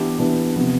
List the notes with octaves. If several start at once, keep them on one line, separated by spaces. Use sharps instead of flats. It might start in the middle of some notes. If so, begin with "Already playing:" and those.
Already playing: E3 B3 D4 G4
E3 B3 D4 G4
C3 F3 B3